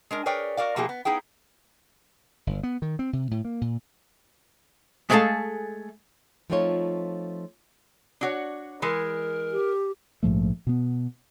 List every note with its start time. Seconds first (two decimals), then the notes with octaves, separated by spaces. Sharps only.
0.11 G#3 D4 A#4
0.26 G#4 A#4 B4 C#5 D5 G5
0.57 F#4 A#4 D5 F5
0.76 B2 F3 A#3 E4 G4 G#4
0.89 B3
1.05 B3 D#4 E4 G#4 G5
2.47 G1
2.63 B3
2.82 D#3
2.99 C4
3.13 C3
3.31 A2
3.45 A#3
3.61 A#2
5.10 G#3 A3 G#4 A4 F5 A5
6.50 F3 A3 C4 D#4 F4 C#5
8.21 D4 F#4 C#5
8.82 E3 G#3 A#4
9.52 G4
10.23 A#1 G#2 F3 A3
10.67 B2 B3